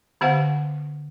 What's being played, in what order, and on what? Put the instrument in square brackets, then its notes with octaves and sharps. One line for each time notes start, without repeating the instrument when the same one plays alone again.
[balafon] D3 B3 G4 C5 F5 F#5